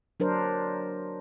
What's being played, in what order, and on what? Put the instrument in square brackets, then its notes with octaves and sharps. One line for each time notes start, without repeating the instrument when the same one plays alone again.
[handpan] F#3 D4 A#4 C5